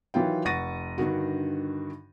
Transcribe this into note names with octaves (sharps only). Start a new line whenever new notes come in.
D#3 E3 F#3 F4 G5
F1 F#5 C#6 A6 A#6 D#7
G2 D3 D#3 F#4